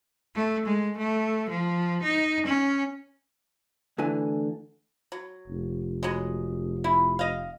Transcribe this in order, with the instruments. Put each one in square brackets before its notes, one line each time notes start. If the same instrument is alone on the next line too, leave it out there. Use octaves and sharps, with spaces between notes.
[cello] A3
G#3
A3
F3
D#4
C#4
[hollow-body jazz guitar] D2 D3 E3 E4 G#5
[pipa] F#3
[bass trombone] F1
[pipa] F#3 G#3
E4
D#5 F5